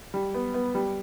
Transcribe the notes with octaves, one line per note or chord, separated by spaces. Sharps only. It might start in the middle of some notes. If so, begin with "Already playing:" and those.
G3
B3
B3
G3